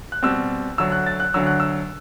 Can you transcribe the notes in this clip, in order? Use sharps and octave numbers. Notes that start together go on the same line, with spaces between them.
F#6
B2 G3 C4 E6
D2 D3 F#3 E6
F#6
A6
F#6
D2 D3 F#3 E6
F#6
E6